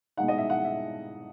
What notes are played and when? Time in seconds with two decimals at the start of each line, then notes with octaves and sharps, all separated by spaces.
0.17 B2 G#3 D#4 F#5
0.28 D#5
0.38 E5
0.50 F#5
0.65 E5